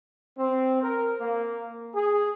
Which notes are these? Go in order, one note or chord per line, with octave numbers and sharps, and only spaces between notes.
C4
A#4
A#3
G#4